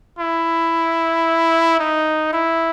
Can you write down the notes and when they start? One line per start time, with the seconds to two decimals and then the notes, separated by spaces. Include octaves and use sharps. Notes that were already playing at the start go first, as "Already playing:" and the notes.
0.19 E4
1.80 D#4
2.33 E4